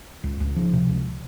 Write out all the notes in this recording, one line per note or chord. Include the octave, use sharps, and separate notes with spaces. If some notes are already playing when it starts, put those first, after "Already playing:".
C#2
C#2
F3
C3
C#2